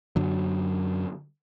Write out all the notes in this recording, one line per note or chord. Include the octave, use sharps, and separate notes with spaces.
F#2 D3 F#3